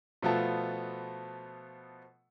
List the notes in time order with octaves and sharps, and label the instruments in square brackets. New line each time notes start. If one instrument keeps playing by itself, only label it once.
[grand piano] B2 F3 A3 B3 F4 A4